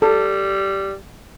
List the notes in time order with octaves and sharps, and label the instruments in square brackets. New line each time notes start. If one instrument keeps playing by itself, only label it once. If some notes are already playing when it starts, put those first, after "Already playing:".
[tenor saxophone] G3 [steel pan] A4